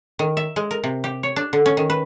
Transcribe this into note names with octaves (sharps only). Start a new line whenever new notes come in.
D#3
E5
G#3
A#4
C3
G4
C#5
D4
D3
C#4
D#3
B4